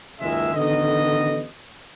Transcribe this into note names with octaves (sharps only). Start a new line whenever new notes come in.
F#1 C#2 G#2 D#3 G#3 E5
A1 D3 D#3 B3 D#5